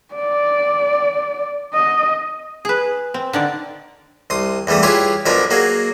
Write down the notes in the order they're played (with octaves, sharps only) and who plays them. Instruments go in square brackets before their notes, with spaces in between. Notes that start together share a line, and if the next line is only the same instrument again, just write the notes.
[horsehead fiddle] D5
D#5
[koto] G#4 B4
C4
D3 D#3 D5
[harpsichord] C2 C6 D#6
E2 E3 G3 A3 D#6
E4 F4 G4 G#4 B4 C#5
B1 F3 D4 A#4 G#5 B5
F#3 A#3 F#4 G#4